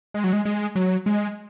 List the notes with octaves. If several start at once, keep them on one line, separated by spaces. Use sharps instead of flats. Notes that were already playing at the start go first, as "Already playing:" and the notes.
G#3
F#3
G#3
G#3
F#3
G#3